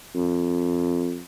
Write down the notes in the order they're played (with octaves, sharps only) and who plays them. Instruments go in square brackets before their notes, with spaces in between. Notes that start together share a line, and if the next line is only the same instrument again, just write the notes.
[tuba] F2